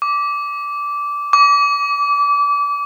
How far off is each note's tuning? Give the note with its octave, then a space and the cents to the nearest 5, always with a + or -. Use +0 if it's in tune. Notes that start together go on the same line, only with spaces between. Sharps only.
D6 -15
D6 -30